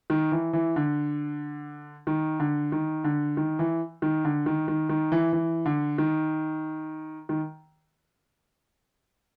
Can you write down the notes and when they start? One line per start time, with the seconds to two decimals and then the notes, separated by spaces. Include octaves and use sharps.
0.10 D#3
0.32 E3
0.53 E3
0.76 D3
2.07 D#3
2.40 D3
2.72 D#3
3.04 D3
3.37 D#3
3.59 E3
4.02 D#3
4.25 D3
4.46 D#3
4.68 D#3
4.89 D#3
5.12 E3
5.33 E3
5.66 D3
5.98 D#3
7.29 D#3